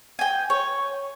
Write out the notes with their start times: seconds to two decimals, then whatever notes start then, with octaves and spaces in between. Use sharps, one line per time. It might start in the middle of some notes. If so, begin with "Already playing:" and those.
0.19 G5 G#5
0.50 C#5